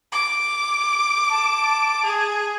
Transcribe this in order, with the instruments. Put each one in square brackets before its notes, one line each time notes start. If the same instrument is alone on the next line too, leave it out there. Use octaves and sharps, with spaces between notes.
[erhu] D6
[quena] A5
[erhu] G#4